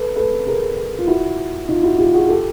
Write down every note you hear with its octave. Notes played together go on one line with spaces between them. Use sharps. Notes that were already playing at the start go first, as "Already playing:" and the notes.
Already playing: A4 B4
A4 B4
G#4 A#4
F4
E4 F#4
D#4 F4
E4 F#4
F4 G4
F#4 G#4
G4 A4